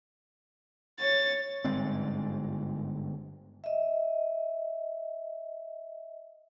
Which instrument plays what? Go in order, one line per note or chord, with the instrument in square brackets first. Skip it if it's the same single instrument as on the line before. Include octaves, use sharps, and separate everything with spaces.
[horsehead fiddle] C#5 [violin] A6
[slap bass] G1 G#2 G#3 C4
[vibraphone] D#5 E5